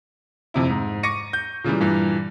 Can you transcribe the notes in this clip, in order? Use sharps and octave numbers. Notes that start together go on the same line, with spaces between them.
F2 C3 E4
G#2
C#6 D6 A#6 C#7 D#7
G6
A#2 C#3 E3 G3
G2 A#2 E3